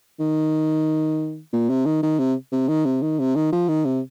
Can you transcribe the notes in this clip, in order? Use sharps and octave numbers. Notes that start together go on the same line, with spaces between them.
D#3
A#2
C3
D#3
D#3
C3
C3
D#3
C3
D#3
C3
D#3
F3
D#3
C3